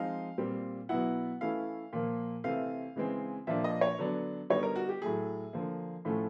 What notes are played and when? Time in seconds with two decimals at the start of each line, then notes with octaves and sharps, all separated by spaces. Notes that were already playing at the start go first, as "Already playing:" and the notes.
Already playing: F3 G#3 C4 D#4 F5
0.38 A#2 G3 C4
0.89 B2 F#3 B3 E4 F#5
1.41 E3 A3 C#4 E4 F5
1.93 A#2 F3 A#3
2.44 C3 E3 A3 C4 F5
2.96 C#3 E3 G#3 C4
3.47 A#2 F3 A#3 D4 E5
3.64 D#5
3.81 C#5
3.99 D3 F#3 B3 D4
4.50 D3 G3 B3 D#4 C#5
4.63 A#4
4.76 F#4
4.89 G4
5.02 A2 F#3 A3 G#4
5.53 D3 F3 A#3
6.05 A2 F3 A3 C#4